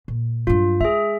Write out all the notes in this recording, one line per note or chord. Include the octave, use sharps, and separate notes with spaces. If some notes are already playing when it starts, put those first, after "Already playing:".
A#2
G2 F#3 F4
G#3 G#4 E5